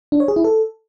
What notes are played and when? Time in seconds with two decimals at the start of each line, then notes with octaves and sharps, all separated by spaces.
0.12 D4
0.20 C#5
0.28 G#4
0.36 E4
0.44 A4